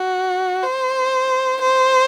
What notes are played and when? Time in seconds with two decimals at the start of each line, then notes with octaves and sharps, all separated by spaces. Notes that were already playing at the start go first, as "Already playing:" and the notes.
Already playing: F#4
0.63 C5
1.61 C5